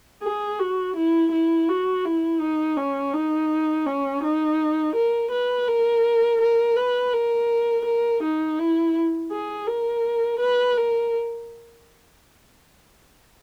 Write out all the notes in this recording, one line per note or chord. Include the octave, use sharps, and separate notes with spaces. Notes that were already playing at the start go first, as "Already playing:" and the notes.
G#4
F#4
E4
E4
F#4
E4
D#4
C#4
D#4
C#4
D#4
A#4
B4
A#4
A#4
B4
A#4
A#4
D#4
E4
G#4
A#4
B4
A#4